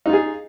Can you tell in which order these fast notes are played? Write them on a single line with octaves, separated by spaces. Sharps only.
D#4 F4 G#4